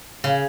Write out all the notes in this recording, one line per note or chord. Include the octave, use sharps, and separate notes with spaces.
C#3